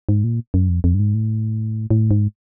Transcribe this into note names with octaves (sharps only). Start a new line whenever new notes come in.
G#2
A#2
F#2
F2
F2
G2
G#2
A2
A2
G#2